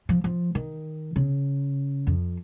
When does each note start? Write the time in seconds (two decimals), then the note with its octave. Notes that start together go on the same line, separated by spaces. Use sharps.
0.09 F3
0.24 F3
0.55 D#3
1.16 C#3
2.07 F2